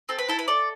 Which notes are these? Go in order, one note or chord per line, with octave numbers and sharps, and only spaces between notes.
C4 A4
B4
E4 A4
B4
A4 D5